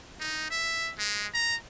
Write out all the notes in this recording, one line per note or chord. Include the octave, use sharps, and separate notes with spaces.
D#4
E5
G#3
A#5